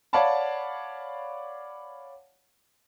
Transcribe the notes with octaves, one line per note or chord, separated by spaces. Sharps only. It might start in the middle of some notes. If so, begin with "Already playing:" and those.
C#5 D5 F5 F#5 A5 B5